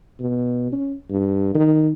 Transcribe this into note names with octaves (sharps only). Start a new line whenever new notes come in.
B2
C#4
G2
D#3